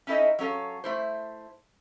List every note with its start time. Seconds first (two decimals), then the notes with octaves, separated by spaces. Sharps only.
0.07 C#4 D#4 E4 A4 D#5 E5
0.39 F#3 C#4 A4 F5
0.84 A3 E4 C5